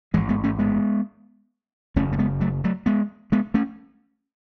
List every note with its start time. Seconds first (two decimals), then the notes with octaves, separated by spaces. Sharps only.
0.14 A1 G#2 E3 G#3
0.29 G#3 B3
0.44 A3 C#4
0.59 G#3 B3
1.96 F#1 E2 C#3 A3 C#4
2.12 A3
2.18 G#3 B3
2.41 F#3 A3
2.64 F#3 A3
2.86 G#3 B3
3.32 G#3 B3
3.54 A3 C#4